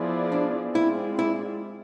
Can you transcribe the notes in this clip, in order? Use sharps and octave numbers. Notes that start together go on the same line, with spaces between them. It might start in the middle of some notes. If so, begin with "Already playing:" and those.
Already playing: F3 B3 E4 G#4 D5
D4
G#3 C4 E4 F4 G#4 D5
E4